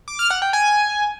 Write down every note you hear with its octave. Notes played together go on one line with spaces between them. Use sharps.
D6
F6
F#5
G5
G#5